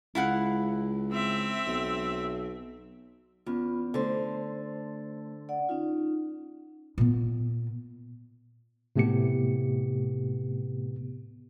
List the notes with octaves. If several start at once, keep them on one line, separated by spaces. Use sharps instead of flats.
C#2 E4 F5 F#5
C4 E5
B1
E2 B3 C#4 F4
D3 A3 C5
D5 F#5
C#4 D#4 F4
A#2 B3
A2 C3 A3 B3 G4 C#7